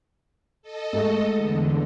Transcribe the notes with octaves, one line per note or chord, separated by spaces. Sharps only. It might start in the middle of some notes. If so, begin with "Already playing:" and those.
A4 D#5
G#2 G#3 A3
E2 D3